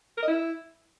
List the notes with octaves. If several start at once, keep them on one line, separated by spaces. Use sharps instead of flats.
A#4
D#5
E4